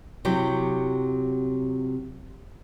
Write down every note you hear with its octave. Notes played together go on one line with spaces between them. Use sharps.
C3 F#3 E4 G4